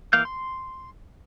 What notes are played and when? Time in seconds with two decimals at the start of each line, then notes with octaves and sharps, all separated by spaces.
0.13 E3 A#3 F5 G6
0.25 C6